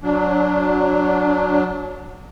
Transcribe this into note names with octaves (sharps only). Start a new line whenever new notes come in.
F#3 D4